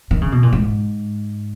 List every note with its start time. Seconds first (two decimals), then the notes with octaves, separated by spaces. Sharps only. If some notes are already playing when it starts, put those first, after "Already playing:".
0.11 D#3
0.21 C#3
0.32 B2
0.43 A#2
0.53 G#2